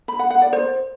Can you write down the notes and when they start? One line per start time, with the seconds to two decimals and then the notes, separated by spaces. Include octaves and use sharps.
0.08 B5
0.19 F#5
0.30 F#5
0.42 D5
0.53 C5